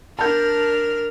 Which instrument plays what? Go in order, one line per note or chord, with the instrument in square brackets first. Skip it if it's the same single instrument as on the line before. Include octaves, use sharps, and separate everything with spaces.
[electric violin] D4 F6 [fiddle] A#4 [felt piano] A5 G6